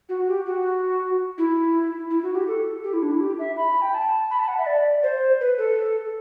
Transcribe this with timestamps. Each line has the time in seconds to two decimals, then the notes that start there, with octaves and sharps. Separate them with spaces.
0.09 F#4
0.28 G4
0.46 F#4
1.38 E4
2.10 E4
2.23 F#4
2.35 G4
2.47 A4
2.84 G4
2.93 E4
3.02 D4
3.11 E4
3.20 G4
3.39 E5
3.57 B5
3.82 G5
3.94 A5
4.31 B5
4.39 A5
4.48 F#5
4.58 E5
4.66 D5
5.03 C5
5.41 B4
5.58 A4